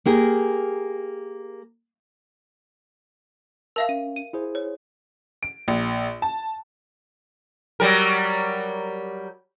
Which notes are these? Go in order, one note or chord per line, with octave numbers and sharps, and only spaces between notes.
A#3 G4 G#4 A#4
A#4 E5 F5 A5 E6
C#4 D#7
D#7
E4 G#4 C5
C#5
D7
A#1
A5
F#3 G3 A#4